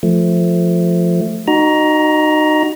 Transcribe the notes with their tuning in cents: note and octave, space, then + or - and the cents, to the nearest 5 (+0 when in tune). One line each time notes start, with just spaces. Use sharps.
F3 +0 A3 +0
D#4 -25 F#4 +15 A#5 +15